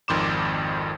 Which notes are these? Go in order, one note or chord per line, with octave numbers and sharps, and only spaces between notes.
G#1 F2 D#3 C6 D6 E7